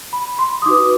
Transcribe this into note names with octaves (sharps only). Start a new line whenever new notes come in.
B5
C6
D#6
D#4 F#4 B4 D6